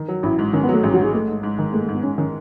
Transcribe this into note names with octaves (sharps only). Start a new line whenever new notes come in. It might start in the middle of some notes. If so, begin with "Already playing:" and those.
Already playing: D#3
F#3
A1 E4
G#2
D#3 C#4
B3
F#3 A3
A1 G#3
F#3
G#2 G#3
G#3 A3
G#2
G#2
D#3
G#3 A3
A3
G#2 B3
G#2 C#4
D#3 C#4